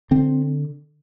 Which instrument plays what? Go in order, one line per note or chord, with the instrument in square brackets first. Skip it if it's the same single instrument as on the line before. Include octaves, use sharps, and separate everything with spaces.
[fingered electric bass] D3 C4